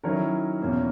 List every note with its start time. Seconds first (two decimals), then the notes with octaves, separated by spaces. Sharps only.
0.03 D#3 F#3 C#4 E4 A#4 C#5
0.60 E2 B2 A#3 C#4